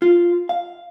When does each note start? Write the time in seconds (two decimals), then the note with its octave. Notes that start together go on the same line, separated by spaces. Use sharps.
0.02 F4
0.49 F5